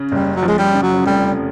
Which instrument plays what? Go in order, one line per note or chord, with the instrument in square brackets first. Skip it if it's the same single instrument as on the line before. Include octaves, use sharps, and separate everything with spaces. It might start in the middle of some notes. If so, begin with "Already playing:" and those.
Already playing: [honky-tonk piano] C#3
[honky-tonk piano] F#1 [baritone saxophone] G3
[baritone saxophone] F#3
[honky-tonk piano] F3
[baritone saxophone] G#3
G3
[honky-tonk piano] C#3
[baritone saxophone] F#3
[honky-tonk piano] F1 [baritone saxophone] G3